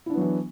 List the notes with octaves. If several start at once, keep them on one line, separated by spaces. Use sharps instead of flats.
E3 F#3 B3 D4 E4